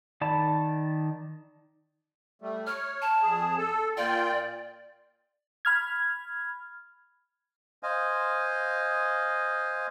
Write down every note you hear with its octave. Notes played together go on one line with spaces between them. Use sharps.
D#3 D5 A5 B5
G3 A3
C#5 F6
A5
F2 G#4
A4
A#2 F4 D5 G5
B5 F6 G#6
C5 D#5 F5 G#5